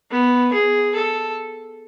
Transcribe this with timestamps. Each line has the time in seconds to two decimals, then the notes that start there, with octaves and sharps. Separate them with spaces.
0.11 B3
0.53 G#4
0.95 A4